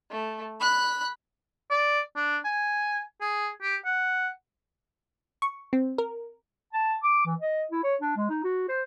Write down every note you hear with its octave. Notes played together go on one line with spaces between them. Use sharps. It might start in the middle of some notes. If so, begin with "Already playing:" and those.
A3
B5 F#6
D5
D4
G#5
G#4
G4
F#5
C#6
C4
A#4
A5
D6
E3
D#5
E4
C#5
D4
G#3
D#4
F#4
C5